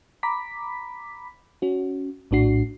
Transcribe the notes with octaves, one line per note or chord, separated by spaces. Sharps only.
A#5 B5 D6 B6
C#4 F#4
A#1 A2 D4 F#4 C7